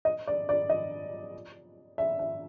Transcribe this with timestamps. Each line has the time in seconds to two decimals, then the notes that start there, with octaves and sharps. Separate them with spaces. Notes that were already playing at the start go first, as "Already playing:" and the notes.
0.05 D#5
0.27 D5
0.49 D5
0.70 D#5
1.98 E5
2.19 E5